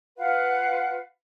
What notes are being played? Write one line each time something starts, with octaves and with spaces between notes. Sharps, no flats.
F4 B4 F5 F#5